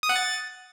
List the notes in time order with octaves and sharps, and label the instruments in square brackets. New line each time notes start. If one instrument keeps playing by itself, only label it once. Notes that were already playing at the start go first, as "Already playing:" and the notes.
[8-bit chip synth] D#6
F#5
A6